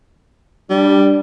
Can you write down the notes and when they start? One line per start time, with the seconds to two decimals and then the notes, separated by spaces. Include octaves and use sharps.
0.70 G3 D4